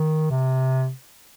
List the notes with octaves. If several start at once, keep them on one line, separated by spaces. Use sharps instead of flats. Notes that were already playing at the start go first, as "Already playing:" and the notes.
Already playing: D#3
C3